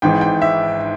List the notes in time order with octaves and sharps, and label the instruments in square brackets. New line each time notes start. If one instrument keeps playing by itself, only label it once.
[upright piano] G#1 G#2 E3 G5
G5
E5